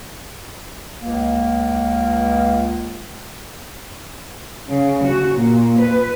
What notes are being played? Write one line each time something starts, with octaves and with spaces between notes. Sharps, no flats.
C#2 A#3
C#3
F#4
A#2
B4